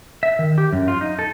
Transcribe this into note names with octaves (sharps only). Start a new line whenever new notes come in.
E5
D#3
G4
F#2
F4
D#4
A4